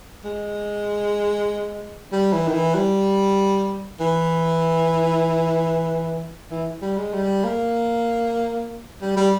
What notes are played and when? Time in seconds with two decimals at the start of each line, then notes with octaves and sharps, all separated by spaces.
0.24 G#3
2.12 G3
2.33 E3
2.48 D#3
2.54 E3
2.75 G3
4.00 E3
6.51 E3
6.82 G3
6.98 G#3
7.13 G3
7.44 A#3
9.02 G3
9.16 G3